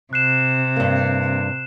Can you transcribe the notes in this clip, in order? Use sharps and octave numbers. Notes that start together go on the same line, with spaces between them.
C3 F#6 C7 E7
G2 A#3